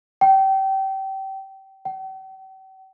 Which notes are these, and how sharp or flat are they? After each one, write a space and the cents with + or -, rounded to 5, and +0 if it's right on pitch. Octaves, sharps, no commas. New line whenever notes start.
G5 -25
G5 -45